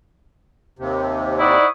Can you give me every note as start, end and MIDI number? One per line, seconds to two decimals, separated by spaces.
0.79 1.57 39
0.79 1.57 48
1.39 1.66 63
1.39 1.67 64
1.39 1.66 72
1.39 1.66 74
1.39 1.68 78
1.39 1.68 85
1.39 1.68 87